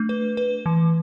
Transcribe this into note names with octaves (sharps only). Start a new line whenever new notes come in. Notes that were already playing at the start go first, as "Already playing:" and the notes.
Already playing: A3 D4
B4
B4
E3